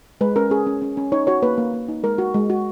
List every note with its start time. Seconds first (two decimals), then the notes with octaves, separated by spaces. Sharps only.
0.21 G#3 B4
0.36 C#4 A#4
0.50 C#4 G#4
0.67 C#4
0.82 C#4
0.97 C#4
1.12 D#4 C#5
1.27 F#4 C#5
1.42 A#3 B4
1.58 A#3
1.74 A#3
1.88 D#4
2.03 G#3 A#4
2.18 F#4
2.34 G#3
2.50 F#4